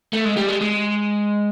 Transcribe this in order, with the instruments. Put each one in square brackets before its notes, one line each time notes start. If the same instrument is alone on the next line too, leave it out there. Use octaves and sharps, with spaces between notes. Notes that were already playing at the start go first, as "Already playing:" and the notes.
[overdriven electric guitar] A3
G#3
G3
G#3
G#3